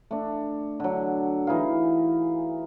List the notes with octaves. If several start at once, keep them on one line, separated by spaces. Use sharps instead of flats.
A3 D4
D3 F#3
E3 D#4 G#4 F5